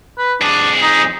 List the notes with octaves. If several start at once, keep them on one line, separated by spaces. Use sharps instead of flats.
B4
F2 D4 G#4
D#4